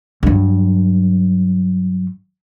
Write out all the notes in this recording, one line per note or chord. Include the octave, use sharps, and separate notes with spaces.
G2 F#3